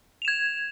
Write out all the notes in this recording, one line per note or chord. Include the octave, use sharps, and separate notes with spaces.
G#6 E7 F7